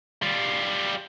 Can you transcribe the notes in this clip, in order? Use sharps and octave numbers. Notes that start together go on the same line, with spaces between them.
G3 F4